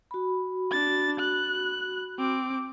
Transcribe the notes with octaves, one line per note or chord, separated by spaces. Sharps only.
F#4 B5
D4 A6
F#6
C4 D6